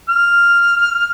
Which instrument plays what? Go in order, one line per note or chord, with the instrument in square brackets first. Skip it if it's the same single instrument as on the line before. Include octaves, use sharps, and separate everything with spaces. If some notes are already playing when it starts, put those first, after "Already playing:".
[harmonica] F6